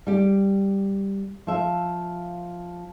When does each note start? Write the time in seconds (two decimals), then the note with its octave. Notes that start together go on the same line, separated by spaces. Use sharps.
0.07 G3 G4
1.47 F3 E5